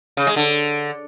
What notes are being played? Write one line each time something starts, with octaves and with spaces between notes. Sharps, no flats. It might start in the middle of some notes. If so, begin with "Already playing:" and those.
C#3
G#3
D3